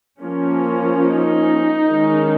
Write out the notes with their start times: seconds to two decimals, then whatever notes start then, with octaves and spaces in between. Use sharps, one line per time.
0.21 F3 A#3 C#4
1.04 D#4
1.88 D#3 G#3 C#4